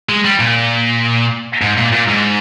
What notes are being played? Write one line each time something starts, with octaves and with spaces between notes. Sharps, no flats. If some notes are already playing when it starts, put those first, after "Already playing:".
G#3
G3
A#2
G#2
A#2
A#2
G#2